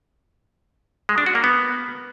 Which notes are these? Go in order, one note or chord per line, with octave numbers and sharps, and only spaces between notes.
G#3
D4
F#4
A#3
B3